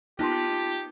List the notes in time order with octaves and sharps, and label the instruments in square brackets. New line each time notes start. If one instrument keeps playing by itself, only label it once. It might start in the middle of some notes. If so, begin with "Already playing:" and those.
[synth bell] A#3 B3 D#4 [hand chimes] F4 A5 C6 [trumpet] G4